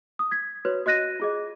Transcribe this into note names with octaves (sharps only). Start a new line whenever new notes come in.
D#6
G#6 B6
F#4 B4 C#5
F#4 D#5 F#6 A#6 D#7
F4 G#4 D#5